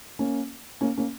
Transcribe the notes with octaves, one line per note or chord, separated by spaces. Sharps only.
A#3 C#4
A#3 C#4
A#3 C#4